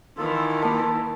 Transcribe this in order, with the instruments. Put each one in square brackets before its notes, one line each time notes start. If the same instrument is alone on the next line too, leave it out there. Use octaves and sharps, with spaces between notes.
[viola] D#3 E3 [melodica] F4 A4
[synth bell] A#3 A#4 [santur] A5